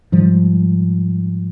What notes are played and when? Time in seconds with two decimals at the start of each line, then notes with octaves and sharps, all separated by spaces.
0.12 G#2 F3 G3